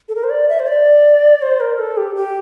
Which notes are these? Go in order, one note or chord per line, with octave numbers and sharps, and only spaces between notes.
A4
A#4
C5
D5
E5
C5
D5
C5
A#4
A4
G4
G4